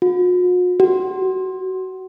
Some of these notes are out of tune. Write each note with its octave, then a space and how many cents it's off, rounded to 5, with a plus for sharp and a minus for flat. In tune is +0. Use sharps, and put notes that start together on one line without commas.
F#4 -45
F#4 +25